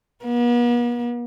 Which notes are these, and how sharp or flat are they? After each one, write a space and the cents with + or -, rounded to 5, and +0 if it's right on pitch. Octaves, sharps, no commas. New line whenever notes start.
B3 -45